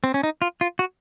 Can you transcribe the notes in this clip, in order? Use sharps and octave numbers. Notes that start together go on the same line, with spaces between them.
C4
C#4
D#4
F4
F4
F#4